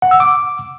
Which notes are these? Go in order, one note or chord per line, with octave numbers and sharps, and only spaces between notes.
F#5
E6
D6